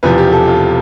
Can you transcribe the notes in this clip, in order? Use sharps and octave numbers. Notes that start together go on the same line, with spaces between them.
E1 E2 C3 F3 B4
G4
A4
F4